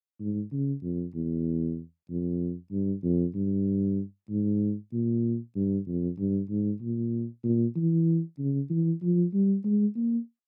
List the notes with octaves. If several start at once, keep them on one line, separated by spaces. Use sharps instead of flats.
G#2
C#3
F2
E2
F2
G2
F2
G2
G#2
A#2
G2
F2
G2
G#2
A#2
A#2
E3
C#3
E3
F3
G3
G#3
A#3